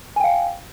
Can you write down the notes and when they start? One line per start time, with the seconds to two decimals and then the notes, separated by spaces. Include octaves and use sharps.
0.16 G#5
0.20 G5
0.24 F5